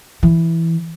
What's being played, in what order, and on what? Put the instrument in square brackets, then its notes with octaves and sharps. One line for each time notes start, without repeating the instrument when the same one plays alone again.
[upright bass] E3